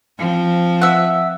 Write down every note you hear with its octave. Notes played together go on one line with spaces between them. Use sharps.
F3 C4
E5 F#5